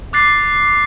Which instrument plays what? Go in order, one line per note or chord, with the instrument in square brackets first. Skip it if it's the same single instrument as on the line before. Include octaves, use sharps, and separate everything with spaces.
[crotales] D6 F#6 A6 C7